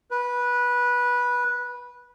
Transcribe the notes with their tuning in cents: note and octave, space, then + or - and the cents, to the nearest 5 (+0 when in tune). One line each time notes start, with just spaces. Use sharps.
B4 -15